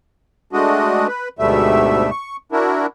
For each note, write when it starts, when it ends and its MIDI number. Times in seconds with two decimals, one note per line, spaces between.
0.53 1.07 56
0.53 1.07 57
0.53 1.07 62
0.53 1.07 66
0.53 1.07 75
1.07 1.29 71
1.39 2.10 38
1.39 2.10 44
1.39 2.10 47
1.39 2.10 55
1.39 2.10 57
1.39 2.10 76
2.11 2.37 85
2.52 2.87 62
2.52 2.87 64
2.52 2.87 66
2.52 2.87 70